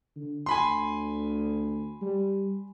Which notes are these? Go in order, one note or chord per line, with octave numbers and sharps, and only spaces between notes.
D3
D2 G#5 B5 C6
G3